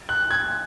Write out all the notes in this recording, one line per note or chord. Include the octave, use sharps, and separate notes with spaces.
F#6
G#6